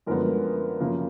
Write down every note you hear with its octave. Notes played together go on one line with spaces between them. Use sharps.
F#2 D3 F3 G#3 B3 A#4
F#2 C#3 F3 A#3